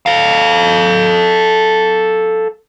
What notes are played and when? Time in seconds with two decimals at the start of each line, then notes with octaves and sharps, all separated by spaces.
0.06 A4 F5